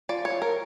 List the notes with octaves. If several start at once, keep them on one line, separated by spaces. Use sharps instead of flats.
F3 D5
C#5
F3
A#4